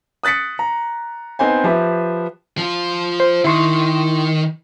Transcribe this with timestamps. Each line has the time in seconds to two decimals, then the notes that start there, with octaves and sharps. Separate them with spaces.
0.24 D#6 F#6 A6 B6 C#7
0.59 A#5
1.39 B3 C4 D#4 C5 G#5
1.64 F3 G4 B4 E5
2.58 F3 F4
3.20 C5
3.45 D#3 E4 C6 C#6